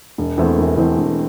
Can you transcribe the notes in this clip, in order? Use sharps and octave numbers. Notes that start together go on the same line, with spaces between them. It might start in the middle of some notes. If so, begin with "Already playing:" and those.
E1
E2 E3 A3 C4
E1
E2 E3 A3 C4
E1